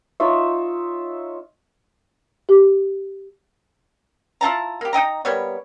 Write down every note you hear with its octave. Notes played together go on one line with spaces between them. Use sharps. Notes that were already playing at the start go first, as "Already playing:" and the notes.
D#4 F4 C#5 E5
G4
E4 F4 A5 A#5
A#3 G4
D#4 D#5 G5 A#5
G3 A#3 B3 C#5